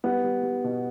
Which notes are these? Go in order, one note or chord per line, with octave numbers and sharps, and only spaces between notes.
G3 B3
G3
G3
B2